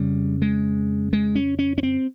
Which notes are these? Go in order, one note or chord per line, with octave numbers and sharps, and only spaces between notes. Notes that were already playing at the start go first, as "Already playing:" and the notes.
Already playing: F2 C#3 G3
G#3
G#3
C#4
C#4
C#4
C4